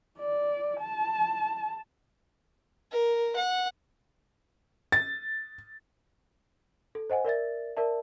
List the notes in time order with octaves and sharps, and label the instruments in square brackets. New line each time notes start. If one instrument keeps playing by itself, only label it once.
[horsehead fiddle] D5
A5
[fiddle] A#4
F#5
[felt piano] A6
[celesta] A4
C5 D#5 F#5 G#5
A#4 D5 E5 A6
A#4 D5 E5 A5